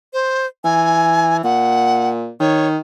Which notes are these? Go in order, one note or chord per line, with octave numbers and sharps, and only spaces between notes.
C5
E3 G#5
A#2 F#5
D#3 C#5